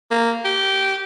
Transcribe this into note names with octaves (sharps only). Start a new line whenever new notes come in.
A#3
G4